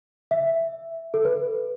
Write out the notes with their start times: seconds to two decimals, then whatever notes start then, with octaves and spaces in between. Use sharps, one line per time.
0.31 E5
1.14 A4
1.25 B4